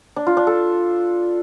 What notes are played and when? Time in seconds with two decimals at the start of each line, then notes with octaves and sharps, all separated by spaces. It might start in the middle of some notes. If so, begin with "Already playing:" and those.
0.16 D4
0.27 F4
0.37 D4
0.47 A4